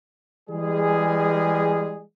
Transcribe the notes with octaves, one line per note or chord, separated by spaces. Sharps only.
E3 G3 G#3 G#4